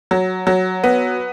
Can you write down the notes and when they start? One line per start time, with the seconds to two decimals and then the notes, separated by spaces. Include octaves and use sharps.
0.11 F#3
0.47 F#3
0.84 B3